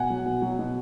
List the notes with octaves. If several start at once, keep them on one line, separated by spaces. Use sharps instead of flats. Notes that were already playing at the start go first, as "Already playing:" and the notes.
Already playing: B2 F#5 G#5
F#3
B2
F#3
B2